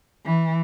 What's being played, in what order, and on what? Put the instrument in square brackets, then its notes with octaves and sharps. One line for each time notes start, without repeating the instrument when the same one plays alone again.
[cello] E3